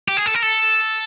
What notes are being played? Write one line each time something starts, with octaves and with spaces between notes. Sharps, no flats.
G4
G#4
A4
A#4
A4